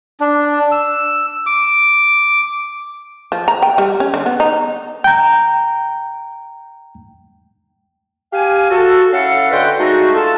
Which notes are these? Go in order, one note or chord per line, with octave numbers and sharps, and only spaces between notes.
D4
E6
D6
F3
A#5
G5
G3
C#4
D3
B3
D#4
G5 A#5
G4 F5 G#5
F#4 A4
C#4 E4 A4 F5 F#5
D3 F#4 B4 D#5 G5 C6
G#3 A3 D#4 F#4
F4 A4 A5